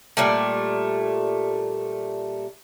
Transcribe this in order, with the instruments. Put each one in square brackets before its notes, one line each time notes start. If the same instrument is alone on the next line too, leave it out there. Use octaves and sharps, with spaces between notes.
[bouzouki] A#2 G3 A3